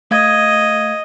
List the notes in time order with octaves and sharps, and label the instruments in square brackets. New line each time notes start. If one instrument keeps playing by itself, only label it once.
[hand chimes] A3 F5 G#6 [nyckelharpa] D#5